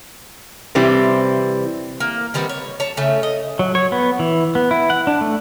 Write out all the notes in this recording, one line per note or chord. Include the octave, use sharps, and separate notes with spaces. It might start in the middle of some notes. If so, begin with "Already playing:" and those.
C3 E3 G3 C4 E4
A#3
D#3 G3 B3 C4
C#5
C#5 A5
C#3 A3 C#4
D#5
F#3
C#5
B3
E3
B3
E4
F#5
D4
A3